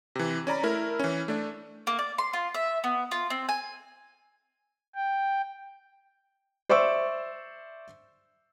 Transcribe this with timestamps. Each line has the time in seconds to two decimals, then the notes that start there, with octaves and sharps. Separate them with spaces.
0.15 C3 E3
0.47 C#4 D5 A#5 B5
0.63 A3 E4 A#4
0.99 E3 C#4
1.28 A3 D4
1.87 A#3
1.99 D5
2.18 C6
2.33 F4
2.54 E5
2.84 B3
3.11 F4
3.30 C4
3.49 G#5
4.95 G5
6.69 C5 D5 E5 C#6 E6